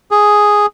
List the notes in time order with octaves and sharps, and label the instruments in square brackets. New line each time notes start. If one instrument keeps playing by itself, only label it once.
[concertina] G#4